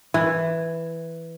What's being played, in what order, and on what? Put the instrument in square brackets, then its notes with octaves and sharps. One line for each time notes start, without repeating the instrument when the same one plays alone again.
[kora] E3